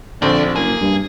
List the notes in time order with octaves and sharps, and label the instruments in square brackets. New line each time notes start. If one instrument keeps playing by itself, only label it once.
[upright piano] A#1 C4 [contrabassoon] D3 [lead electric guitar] D4
[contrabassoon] F#1 [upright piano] A#3 [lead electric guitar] G#4
[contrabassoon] G2